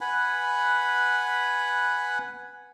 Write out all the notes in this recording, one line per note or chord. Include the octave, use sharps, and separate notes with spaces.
B4 F#5 G#5 B5